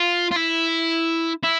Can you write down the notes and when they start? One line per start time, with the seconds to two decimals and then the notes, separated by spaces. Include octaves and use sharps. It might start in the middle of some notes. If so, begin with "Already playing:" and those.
Already playing: F4
0.31 F4
0.36 E4
1.43 E4